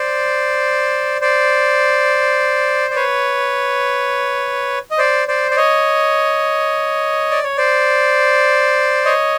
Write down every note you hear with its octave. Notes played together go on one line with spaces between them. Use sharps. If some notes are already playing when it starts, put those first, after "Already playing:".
Already playing: C5 D5
C5 D5
D5
B4 C#5
D#5
C5 D5
C5 D5
D5
C#5 D#5
D5
C#5
C5 D5
C#5 D#5